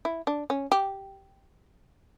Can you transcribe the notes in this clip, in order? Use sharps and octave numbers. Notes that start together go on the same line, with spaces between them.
E4
D4
C#4
G4